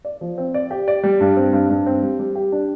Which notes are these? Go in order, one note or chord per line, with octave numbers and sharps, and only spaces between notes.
D5
F3
C4
D5
G4
D5
G3
G2
C4
G2
G2
C4
G3
G3
G4
D4